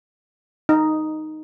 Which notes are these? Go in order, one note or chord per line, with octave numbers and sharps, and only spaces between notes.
D#4